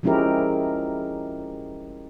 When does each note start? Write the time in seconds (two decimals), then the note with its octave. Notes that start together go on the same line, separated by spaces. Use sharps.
0.03 F3 G#3 C#4 E4 G4 A#4